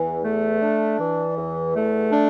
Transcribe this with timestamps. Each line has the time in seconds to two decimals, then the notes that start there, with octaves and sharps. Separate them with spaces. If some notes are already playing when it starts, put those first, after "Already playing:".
Already playing: E2 E3
0.23 A3
0.61 D4
0.99 E3
1.36 E2
1.75 A3
2.12 D4